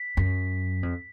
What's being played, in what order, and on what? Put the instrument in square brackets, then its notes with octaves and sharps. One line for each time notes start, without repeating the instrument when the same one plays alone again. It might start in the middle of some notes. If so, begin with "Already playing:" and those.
Already playing: [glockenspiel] B6
[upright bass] F#2
F2